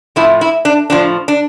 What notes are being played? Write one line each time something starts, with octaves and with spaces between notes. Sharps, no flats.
A2 F3 E4
E4
D4
A2 F3 D4
D4